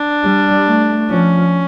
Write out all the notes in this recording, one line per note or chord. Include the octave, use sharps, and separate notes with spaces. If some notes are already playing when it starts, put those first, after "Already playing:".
Already playing: D4
G3
A3
F3 C#4